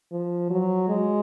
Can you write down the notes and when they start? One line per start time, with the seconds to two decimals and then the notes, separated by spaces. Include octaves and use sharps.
0.12 F3
0.50 F#3
0.89 G#3